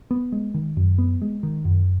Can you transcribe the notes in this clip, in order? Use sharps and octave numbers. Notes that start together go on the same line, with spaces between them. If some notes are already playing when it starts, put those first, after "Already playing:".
B3
G#3
D#3
F#2
B3
G#3
D#3
F#2